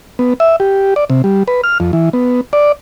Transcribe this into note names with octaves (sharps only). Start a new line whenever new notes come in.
B3
E5
G4
D5
C3
G3
B4
F6
F2
E3
B3
D5